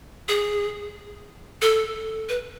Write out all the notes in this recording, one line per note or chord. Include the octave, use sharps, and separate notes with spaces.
G#4
A4
B4